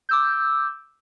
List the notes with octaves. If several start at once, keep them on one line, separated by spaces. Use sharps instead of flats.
D6 E6 G6